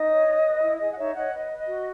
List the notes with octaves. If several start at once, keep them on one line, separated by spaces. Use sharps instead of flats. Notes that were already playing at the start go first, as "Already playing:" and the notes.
Already playing: D#4 D#5
C#5
B4
B4
E4
E5
G#4 D#5
F#5
D#4 C#5 E5
C#5 D#5 F#5
B4 D#5
B4
D#5
F#4